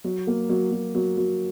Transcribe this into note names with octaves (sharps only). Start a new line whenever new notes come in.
F#3
A#3
F#3
F#3
F#3
F#3